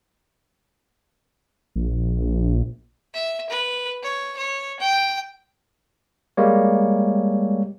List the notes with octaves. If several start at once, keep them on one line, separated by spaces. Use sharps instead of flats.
A#1
E5
B4
C#5
C#5
G5
G3 G#3 A#3 C#5